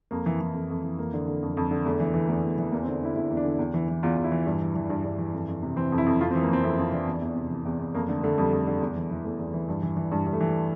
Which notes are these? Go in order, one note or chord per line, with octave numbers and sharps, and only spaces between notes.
F2 A#3
E3
E3
F2
F2
E3
F2 A#3
D3
D3
F2
F2
D3
E2 A3
E3
E3
E2 A3
E2
A3
E3
E2 A#3
C4
D3
D4
D3 E4
E2 E4
E2
D4
D3
E2
E3
E3
E2 F4
E2
E4
E3
G2
E3
E3
G2 D4
G2
E3
F2
F2
C3
E3 C4
F2
E4
F2
F2 F4
C4
E3
A#3
E3 C4
F2 E4
F2 F4
E3 D4
E2
E2
C3
E3
E2
E2
F2 A#3
D3 A3
D3 A3
F2 G3
F2
D3
E2
E3
E3
E2 A3
E2
E3
G2
E3
E3
G2 G3
G2
A3
E3